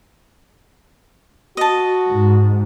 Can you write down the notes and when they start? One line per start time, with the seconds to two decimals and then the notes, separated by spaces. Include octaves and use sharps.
1.57 F#4 D#5 A5
2.11 G#2